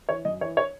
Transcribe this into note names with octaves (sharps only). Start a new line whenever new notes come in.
E3 C#5
F#2 D#5
E3 C#5
C#5